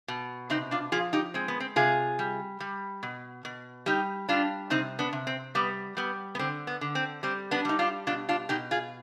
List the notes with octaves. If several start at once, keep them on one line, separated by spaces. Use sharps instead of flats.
B2
C3 C4 D#4
D4 F4
F3 F4 G#4
D#4 G4
G#3 C4
B3
C4
C3 F4 G#4
G3
G3
B2
B2
G3 D#4 G4
G3 D4 F4
C3 C4 D#4
B3 D4
C3
C4
G3 B3
G3 B3
B3
D3 C4
B3
D3
C4
G3 C4
B3 D4
G3 D#4
D4 F4
B2 D4 F4
D4 F4
B2 D#4 G4
F4 G#4